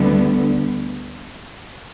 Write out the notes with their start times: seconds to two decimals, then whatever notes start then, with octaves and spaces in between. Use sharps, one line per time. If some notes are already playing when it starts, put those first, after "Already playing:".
Already playing: D2 D3 G3 B3